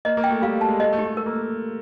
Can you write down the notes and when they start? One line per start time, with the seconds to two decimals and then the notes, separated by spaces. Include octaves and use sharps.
0.05 A#3 D#5
0.17 A#3
0.24 G5
0.30 A3
0.42 G3 F5
0.61 A5
0.69 G#3
0.80 A3 D#5
0.93 A3
0.99 G4
1.05 A3
1.17 A#4
1.26 A#3